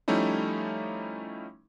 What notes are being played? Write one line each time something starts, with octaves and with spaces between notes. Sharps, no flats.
F3 G3 A3 C#4 D#4 E4